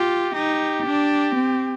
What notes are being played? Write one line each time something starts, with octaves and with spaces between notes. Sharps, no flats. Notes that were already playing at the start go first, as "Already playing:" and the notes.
Already playing: F4 G4
D#4 G4
D4
C4